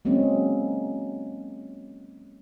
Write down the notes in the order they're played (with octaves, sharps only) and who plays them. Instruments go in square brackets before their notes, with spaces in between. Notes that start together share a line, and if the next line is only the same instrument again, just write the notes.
[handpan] F#3 G#3 A#3 C4 C#4